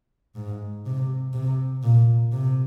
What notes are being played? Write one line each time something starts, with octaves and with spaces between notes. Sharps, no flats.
G#2
C3
C3
A#2
C3